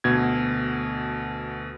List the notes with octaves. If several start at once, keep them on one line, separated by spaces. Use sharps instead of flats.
D2 B2 G#6